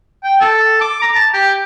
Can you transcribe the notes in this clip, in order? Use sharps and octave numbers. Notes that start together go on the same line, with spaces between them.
G5
A4
D6
A#5
A5
G4